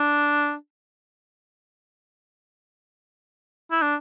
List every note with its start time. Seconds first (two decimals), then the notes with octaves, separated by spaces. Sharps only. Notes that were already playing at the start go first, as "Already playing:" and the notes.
Already playing: D4
3.71 E4
3.82 D4